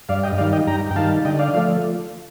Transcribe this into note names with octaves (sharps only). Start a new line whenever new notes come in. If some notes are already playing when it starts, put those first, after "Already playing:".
G2 D5 F5
D#5 G5
D#3 G3 D5 F5
D#5 G5
G2 G5 A#5
G5
D#3 G3 F5 A5
D3 D#5 G5
D5 F5
F3 A3 D5 F5